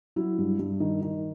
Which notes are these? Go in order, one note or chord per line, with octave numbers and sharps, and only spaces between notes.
F#3 E4
G2
G2
D#3
D#3